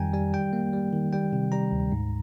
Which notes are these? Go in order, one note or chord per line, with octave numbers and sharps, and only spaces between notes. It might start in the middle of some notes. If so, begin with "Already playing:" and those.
Already playing: F2 D#3 G3 G5 G#5 A#5
G3 G#5
G3 G5
A#3
G3
D#3
G3 G5
C3
G3 A#5
D2
G#2